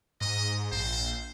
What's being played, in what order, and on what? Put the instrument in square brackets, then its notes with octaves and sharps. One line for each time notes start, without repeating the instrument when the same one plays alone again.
[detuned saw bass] G#2 [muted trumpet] D#5
[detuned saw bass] A#1 [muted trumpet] C5